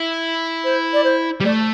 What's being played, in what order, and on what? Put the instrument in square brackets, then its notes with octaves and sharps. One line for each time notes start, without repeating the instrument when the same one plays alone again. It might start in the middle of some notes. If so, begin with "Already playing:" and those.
Already playing: [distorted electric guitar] E4
[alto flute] C5
D5
C5
[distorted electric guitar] G3
[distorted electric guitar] A3 [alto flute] D5